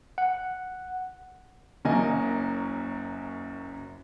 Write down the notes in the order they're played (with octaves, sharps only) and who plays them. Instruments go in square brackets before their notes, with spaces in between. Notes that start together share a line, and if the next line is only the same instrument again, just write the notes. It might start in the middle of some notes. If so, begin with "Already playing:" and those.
[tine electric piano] F#5
[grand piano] F#1 F#2 F#3 A#3 D#5 G#5